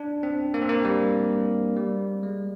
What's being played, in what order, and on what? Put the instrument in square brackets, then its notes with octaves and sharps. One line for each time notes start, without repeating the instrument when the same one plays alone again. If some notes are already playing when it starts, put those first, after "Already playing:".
Already playing: [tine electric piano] D4
C4
A#3
C4
A#3
G3
G3
G#3